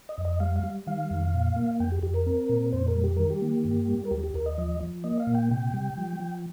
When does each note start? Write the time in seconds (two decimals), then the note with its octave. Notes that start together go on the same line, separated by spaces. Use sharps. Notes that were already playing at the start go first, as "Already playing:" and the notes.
0.09 D#5
0.18 F2
0.25 D#5
0.40 G3 F5
0.56 F5
0.63 G3
0.87 D#3 F5
1.11 F2
1.34 A#2
1.56 A#3
1.80 F2 G5
1.92 G4
2.03 F2 G4
2.14 A#4
2.26 C4
2.49 A#2
2.72 F2 C5
2.88 A#4
2.96 G3
3.04 G4
3.17 D#3 A#4
3.30 G4
3.41 A#3
3.65 G2
3.88 G3
4.05 A#4
4.11 D#2 G4
4.24 G4
4.34 D#2 A#4
4.46 D#5
4.58 F3 D#5
4.81 F3
5.04 A#3 D#5
5.20 F5
5.27 A#2
5.35 G5
5.51 C3 G5
5.74 G3
5.98 F3
6.20 F3